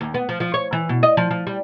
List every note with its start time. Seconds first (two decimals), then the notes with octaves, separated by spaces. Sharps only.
0.01 D#2
0.14 B3
0.29 F3
0.40 F3
0.54 C#5
0.73 E3
0.89 B2
1.03 D#5
1.17 F3
1.31 F3
1.47 G3